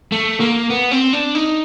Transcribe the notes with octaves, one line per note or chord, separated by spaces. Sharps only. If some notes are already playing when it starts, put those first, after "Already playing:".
A3
A#3
B3
C4
D4
D#4